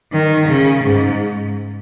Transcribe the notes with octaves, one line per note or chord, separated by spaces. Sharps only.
D#3
C#3
G#2